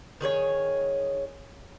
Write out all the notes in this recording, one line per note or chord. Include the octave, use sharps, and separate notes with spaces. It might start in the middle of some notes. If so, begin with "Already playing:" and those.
D#3 G#4 C5 C#5